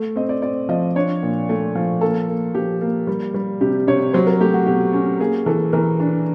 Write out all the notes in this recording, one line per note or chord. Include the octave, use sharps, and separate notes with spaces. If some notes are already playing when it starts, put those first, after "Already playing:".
Already playing: A3
C4 D#5
D5
C4 D5
F3 D#5
D4 C#5
A#2
A3
F3
A#3 A4
A#3
F3 G4
A#3
G3
G3
C3 G4
C3 C#5
F#3 C5
A#4
A3 G4
F#4
B2 G4
C#4
A#3 G#4
E3 A4
E3 A#4
D4